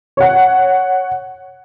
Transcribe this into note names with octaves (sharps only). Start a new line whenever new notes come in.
C#5 F#5